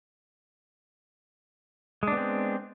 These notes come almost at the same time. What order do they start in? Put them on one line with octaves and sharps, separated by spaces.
G#3 D4 B3 C4